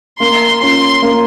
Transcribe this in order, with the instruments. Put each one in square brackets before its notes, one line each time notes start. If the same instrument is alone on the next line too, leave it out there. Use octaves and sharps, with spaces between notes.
[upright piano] A#3 [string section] C6
[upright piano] C#4 F4 [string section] C6
[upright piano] A#3